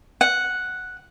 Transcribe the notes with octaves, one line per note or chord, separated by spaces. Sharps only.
F#5